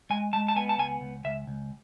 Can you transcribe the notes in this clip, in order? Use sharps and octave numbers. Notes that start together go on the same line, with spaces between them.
G#3 G#5
G#3 A5
A5
B3 G#5
A5
C#2 G#5
C#2
C#2 E5
C#2